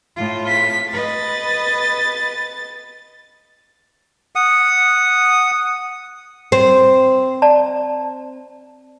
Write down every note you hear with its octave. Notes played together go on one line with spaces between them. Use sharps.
A2 F4
B6
B4 D#5 A6
F#5 D#6
C4
D5 A5 A#5